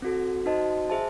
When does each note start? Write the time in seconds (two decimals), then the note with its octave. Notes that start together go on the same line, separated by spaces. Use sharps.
0.02 C4 F#4 A4
0.46 D#4 F#4 C5 D#5 A5
0.90 G#4 C5 E5 A5